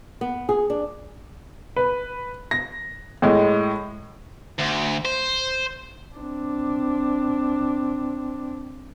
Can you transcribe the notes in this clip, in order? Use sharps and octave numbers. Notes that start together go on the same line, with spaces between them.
B3
G#4
D4
B4
A#6
A2 G#3
D2
C5
C4 D4